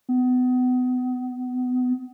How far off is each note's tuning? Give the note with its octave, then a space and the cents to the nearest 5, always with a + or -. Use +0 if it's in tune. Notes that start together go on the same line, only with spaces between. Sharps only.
B3 +30